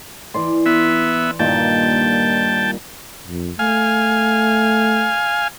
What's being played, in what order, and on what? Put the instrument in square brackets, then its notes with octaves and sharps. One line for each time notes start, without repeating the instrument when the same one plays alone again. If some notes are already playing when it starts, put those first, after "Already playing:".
[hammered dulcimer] E3 D5 C6
[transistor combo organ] B3 E5
[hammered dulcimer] G2 A#2 D#3 [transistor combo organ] G5 A5
[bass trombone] F2
[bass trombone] A3 [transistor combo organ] F5 G#5